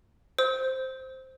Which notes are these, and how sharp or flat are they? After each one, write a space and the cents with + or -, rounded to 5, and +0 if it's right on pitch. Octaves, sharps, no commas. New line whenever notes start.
C5 +0 E6 -45